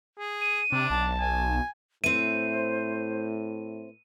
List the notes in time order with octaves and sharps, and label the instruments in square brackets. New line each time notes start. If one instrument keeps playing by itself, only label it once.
[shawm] G#4
[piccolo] D#7
[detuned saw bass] C3 [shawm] D4
[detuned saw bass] B1 [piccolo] A5
[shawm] G#5
[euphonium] A2 [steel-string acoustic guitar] C4 E5 [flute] C5 [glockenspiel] D#7